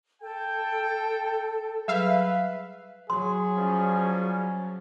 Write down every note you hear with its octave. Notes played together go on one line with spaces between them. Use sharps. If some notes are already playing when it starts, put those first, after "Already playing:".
A4 G5
F#3 G3 G#4 B4 E5 F5
F#3 G#4 C6
F3 G3 C#4